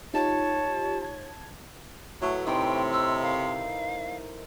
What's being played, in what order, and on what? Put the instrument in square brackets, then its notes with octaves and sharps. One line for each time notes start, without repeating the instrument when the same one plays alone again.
[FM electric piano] D#4 F4 G4 [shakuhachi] C#5 [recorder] A5
[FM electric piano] A5 G#6
[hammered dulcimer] A2 A3 B4 [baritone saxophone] F#3
[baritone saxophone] C3 [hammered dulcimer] D#4 E4 C5 [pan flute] G5
[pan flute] E6
[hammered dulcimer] A#4 [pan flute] F5